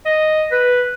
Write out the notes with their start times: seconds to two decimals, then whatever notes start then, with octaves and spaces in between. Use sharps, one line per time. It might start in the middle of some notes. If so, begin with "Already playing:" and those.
0.06 D#5
0.52 B4